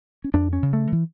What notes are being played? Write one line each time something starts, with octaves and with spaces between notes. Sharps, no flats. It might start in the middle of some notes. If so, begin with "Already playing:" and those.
C#4
F2 D4
C#4
C#3
A3
E3